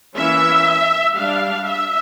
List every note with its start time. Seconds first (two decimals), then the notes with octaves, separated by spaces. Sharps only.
0.16 E3 A#3 C#4 E5
1.17 G3 D4 F5
1.67 E5